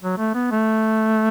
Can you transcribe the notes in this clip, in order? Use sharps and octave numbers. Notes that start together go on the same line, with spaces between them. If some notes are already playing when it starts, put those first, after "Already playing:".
F#3
A3
B3
A3